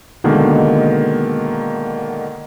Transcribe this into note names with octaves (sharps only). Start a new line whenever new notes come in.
B2 D3 D#3 G#3 A#3